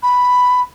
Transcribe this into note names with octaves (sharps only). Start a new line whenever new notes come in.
B5